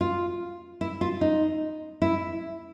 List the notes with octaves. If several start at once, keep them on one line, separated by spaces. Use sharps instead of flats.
F4
E4
F4
D#4
E4